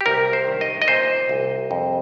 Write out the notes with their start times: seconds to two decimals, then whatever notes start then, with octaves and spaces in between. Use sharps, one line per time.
0.01 G4
0.06 C2 A#4
0.33 C5
0.47 D#3
0.61 D#5
0.82 D#5
0.88 A#2 C5
1.29 C2
1.71 F2